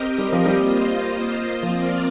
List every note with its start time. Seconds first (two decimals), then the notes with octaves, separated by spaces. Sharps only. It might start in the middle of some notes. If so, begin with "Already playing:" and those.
Already playing: C4 G4 A#4 D#5
0.18 G3
0.32 F3
0.46 G3 A#3 F4 C5 D#5
1.62 F3 C4 F4 A#4 D5